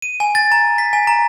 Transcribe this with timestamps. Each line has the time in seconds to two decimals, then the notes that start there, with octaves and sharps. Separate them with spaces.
0.02 D#7
0.20 G#5
0.35 A6
0.52 A#5
0.78 B6
0.93 G#5
1.07 A#5